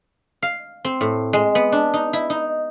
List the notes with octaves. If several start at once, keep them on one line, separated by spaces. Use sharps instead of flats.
F5
C4
A2
G#3
B3
D4
D#4
E4
D#4